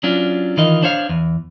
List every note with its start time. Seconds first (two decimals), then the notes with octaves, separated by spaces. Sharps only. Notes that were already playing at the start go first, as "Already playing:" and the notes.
0.03 F#3 C#4 D4 F4
0.57 D#3 E3 D#4 F4 A#4 D#5
0.83 D4 C5 C#5 F5
1.09 E2